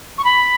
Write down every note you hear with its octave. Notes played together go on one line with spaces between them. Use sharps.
C#6
B5